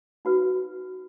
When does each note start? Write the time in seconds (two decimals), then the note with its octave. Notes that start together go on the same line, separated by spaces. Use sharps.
0.25 D#4 F#4 B4